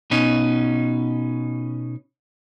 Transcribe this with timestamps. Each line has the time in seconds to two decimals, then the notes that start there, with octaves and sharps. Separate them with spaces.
0.11 B2 C#4 D#4